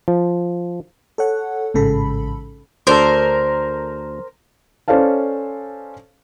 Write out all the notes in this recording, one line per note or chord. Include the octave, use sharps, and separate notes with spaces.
F3
A4 C#5 F#5
A1 G#2 C#3 A4 B5
D2 D4 A4 A#4 C5
C#4 A4 C5 D5 F5 A5